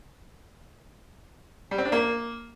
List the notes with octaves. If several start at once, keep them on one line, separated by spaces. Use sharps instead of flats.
G3
C4
D4
A#3